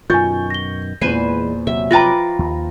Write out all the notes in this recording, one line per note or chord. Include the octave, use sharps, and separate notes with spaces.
F#2 B2 D#3 F4 G#5 C#6 G6 A6
A#6 G7
E2 A#2 E3 G#3 B4 C5 G#5
C3 F#3 E5
F3 F4 B4 G5 A#5 D6 A6 A#6
D#2